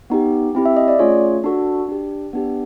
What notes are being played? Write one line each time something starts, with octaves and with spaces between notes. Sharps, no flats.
B3 D#4 G4
C4 E4 G4
E5
D#5
D5
A3 C#4 F4 G#4 C#5
D4 F#4 A4
D4 G4
B3 D4 G4